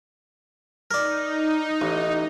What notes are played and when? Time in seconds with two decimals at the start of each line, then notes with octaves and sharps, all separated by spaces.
0.91 D#4 A#4 D5
1.81 A1